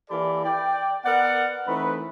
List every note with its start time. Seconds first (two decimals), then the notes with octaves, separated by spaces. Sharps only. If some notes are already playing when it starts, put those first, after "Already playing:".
0.10 E3 A#3 G4 A4 D5 B5
0.45 D5 G5
1.06 B3 A#4 D5 F#5
1.67 E3 A3 C4 D#4 B4